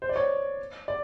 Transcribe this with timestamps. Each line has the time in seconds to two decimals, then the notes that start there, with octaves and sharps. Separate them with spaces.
0.02 C5
0.09 D5
0.16 C#5
0.88 D5